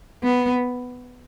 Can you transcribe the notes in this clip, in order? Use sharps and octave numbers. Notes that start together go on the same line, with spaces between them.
B3